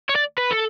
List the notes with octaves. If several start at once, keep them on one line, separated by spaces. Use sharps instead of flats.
C#5
D5
B4
A4